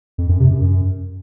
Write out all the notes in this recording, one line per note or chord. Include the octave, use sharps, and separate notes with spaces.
F2
F#2
C3
F#2
F#2